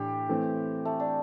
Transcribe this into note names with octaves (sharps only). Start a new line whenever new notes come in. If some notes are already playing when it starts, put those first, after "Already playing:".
Already playing: A2 E3 D4 G4
E3 A3 C4
A3
D4